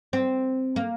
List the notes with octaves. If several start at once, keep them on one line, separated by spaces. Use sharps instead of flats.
C4
A#3